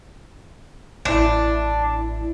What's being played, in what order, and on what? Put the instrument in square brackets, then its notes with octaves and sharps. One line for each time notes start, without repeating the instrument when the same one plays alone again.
[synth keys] A1 E4 [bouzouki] D4